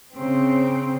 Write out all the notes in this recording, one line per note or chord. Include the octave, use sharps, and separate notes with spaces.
C#3 C4